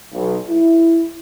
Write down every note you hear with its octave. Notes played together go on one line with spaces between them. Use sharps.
B1
E4